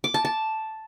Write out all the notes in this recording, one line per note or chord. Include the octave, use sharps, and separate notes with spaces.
D6
A5
A5